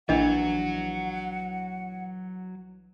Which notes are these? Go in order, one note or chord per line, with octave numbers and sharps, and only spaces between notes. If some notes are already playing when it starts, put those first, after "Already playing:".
A#1 E3 F#3 D4 D#5 F#5